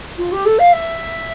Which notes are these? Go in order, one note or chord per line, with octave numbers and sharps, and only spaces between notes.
F4
G4
A4
F5
E5